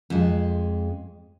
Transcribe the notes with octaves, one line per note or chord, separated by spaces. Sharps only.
F2 G#3